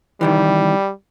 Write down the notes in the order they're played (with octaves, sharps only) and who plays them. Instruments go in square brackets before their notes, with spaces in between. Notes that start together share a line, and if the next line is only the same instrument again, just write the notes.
[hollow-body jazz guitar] C2 D#3 E3 [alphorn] G3